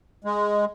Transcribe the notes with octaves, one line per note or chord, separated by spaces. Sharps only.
G#3